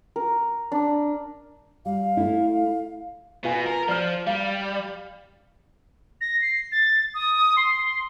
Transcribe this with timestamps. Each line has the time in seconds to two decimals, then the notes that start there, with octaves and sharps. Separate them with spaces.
0.16 A#4
0.72 D4
1.86 G3 F5
2.17 A3 E4
3.44 B2 B3 F4 G#5
3.66 A#4
3.88 F3 D5 F6
4.27 G3 F5
6.21 A#6
6.41 C7
6.72 A6
7.14 D#6
7.57 C6